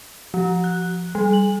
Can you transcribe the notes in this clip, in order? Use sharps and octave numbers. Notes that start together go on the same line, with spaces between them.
F3
F#6
G3
F#7